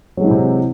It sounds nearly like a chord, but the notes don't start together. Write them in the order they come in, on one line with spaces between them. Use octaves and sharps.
F#3 G#3 E3 C4 C3